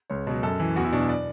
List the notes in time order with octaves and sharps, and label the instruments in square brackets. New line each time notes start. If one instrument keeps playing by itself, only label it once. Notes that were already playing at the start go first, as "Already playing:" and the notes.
[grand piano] C#2 C#5
B2 F#3
F#2 A4
E3
E2 F#4
E4
B2 D4
F#3
D5